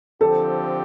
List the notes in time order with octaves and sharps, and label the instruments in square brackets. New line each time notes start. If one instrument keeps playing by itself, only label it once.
[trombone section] D3 F3 C4 G4 [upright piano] A4